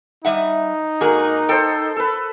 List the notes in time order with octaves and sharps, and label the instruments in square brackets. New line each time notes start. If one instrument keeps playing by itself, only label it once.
[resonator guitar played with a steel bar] G3 E5 F#5 [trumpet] D#4
[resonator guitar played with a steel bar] G#2 F#4 G#4 [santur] A#3
[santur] A4 C5 [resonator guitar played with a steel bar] G5
[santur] A4 B4